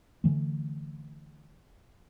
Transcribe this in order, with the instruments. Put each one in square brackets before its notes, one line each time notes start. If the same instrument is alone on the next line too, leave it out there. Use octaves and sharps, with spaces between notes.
[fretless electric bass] D3 E3 A3